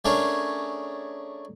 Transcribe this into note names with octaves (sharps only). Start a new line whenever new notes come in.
A3 C#4 D4 G#4 A#4 C#5